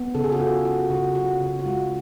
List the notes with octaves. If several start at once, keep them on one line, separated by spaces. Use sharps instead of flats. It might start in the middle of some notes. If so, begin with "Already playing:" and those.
Already playing: B3
C#3 A4
G#4
F#4 A4
F4
F4 F#4
C#3 F#4
F4 F#4
C#3
F#4
G#3 F4